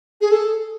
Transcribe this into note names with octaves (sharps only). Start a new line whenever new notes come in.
G#4
A4